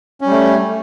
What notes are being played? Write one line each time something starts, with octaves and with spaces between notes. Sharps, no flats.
G3 A3 C#4